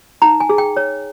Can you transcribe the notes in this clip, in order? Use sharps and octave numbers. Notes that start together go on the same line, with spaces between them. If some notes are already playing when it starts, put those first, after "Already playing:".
D#4 A#5
G#5
G#4
G5
C#5